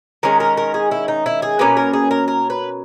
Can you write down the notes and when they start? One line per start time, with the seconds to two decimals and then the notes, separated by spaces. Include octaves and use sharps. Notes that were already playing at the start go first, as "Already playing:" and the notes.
0.23 D#3 G#3 C#4 A#4
0.40 A#4
0.57 A#4
0.74 G#4
0.91 E4
1.08 D#4
1.26 E4
1.42 G#4
1.59 B2 A#3 C#4 B4
1.77 A#4
1.93 G#4
2.11 A#4
2.28 A#4
2.50 B4